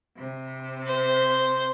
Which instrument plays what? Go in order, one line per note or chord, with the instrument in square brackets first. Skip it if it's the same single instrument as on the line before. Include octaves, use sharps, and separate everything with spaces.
[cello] C3
[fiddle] C5